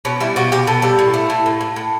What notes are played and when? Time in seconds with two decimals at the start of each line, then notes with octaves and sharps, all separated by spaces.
0.05 B2 C#4
0.20 G3 E4
0.36 B2 F#4
0.52 B2 G4
0.67 B2 A4
0.82 G3 A4
0.99 A2
1.14 A3
1.30 A2
1.46 A2
1.61 A2
1.76 A2